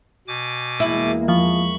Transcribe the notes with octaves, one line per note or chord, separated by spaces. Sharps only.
B2 G#5 D6
E2 G#3 A#3 E4
F3 B5 C#6